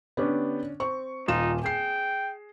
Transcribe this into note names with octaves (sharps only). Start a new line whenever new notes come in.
D3 B3 C#4 D4 G4
C4 C#6
D#1 D#4 F4 E7
G#4 G5 C7